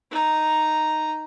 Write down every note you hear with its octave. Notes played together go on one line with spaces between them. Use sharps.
D#4 A#5